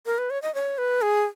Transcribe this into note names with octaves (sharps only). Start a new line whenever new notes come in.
A#4
B4
C#5
D#5
C#5
B4
G#4